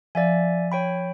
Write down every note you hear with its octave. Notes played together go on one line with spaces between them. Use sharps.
F3 D5 E5 G#5
C#5 G5 B5